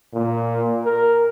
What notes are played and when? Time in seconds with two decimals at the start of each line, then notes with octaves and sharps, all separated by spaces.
0.13 A#2
0.85 A#4